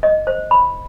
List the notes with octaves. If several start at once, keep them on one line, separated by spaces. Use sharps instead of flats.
D#5
C5
B5